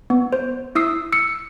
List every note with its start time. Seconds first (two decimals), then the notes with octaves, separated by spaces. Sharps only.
0.10 B3
0.33 C5
0.75 E4 D#6 E6 C7
1.12 E6 C#7